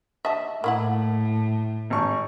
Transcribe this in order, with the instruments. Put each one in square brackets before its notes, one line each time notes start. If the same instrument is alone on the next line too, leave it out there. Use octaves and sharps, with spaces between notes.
[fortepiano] D#5 [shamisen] E5 A5
[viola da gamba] A2 [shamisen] A#3 E4 F#5
[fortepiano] G#1 C#6